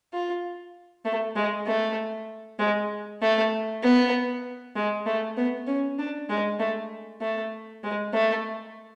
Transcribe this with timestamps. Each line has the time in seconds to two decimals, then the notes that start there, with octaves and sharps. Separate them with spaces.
0.13 F4
1.05 A3
1.36 G#3
1.67 A3
2.59 G#3
3.22 A3
3.83 B3
4.76 G#3
5.06 A3
5.37 B3
5.67 C#4
5.98 D4
6.29 G#3
6.60 A3
7.21 A3
7.84 G#3
8.14 A3